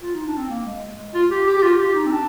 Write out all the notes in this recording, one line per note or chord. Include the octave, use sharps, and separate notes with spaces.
F4
D#4
D4
C4
A#3
G#3
F4
G4
G4
G4
F4
G4
D#4
C4
D4